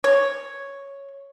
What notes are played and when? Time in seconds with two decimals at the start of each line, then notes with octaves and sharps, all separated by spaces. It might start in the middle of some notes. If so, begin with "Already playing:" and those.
0.04 C#5